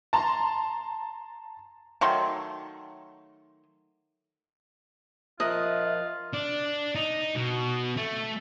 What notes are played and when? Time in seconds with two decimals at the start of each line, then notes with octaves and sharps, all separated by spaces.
0.13 A5 A#5 C6
2.01 D#3 F#3 A3 C6
5.40 F3 F4 A#4 D#5 E5 F#6
6.33 D4
6.95 D#4
7.35 B2
7.97 A3